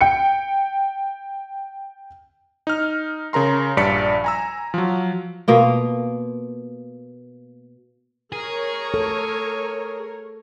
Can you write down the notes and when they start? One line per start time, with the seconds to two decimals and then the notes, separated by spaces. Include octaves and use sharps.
0.01 G5 C#7
2.67 D#4 F6
3.33 C#3 A#4 A#5 C6
3.77 A#1 G2 D5 B6 C#7
4.24 G#5 A#5 E6
4.74 F3 F#3
5.48 B2 A#3 F4
8.32 G#4 A#4 C#5
8.94 A4